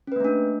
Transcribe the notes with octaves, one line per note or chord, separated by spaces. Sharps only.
A3 A#3 C#4 D4 B4